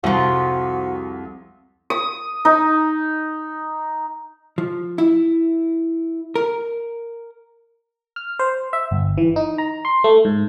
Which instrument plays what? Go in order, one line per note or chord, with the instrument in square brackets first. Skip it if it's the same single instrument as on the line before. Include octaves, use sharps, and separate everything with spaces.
[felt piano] C2 [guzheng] F2 F3 [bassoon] F#4
[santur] D#6
D#4
[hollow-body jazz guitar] F3
E4
A#4
[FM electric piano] F6
C5
E5
G1
E3
D#4
A#5
C6
A3
G#2